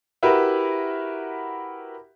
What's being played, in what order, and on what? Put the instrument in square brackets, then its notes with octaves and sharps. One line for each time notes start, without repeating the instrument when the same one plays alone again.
[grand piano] E4 F#4 G4 A#4 B4 E5